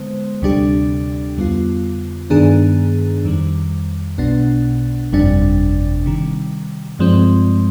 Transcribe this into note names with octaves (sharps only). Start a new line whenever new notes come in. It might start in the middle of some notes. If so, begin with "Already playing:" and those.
Already playing: D3 G#3 B3 C5
D2 C3 G3 D4 G4
F2 D3 G3 B3 F4
G2 D#3 B3 D4 G#4
F2 D#3 G3
B1 B2 B3 D4
G1 F2 C3 G3 D4
C3 D#3 G3
G2 F3 G#3 C4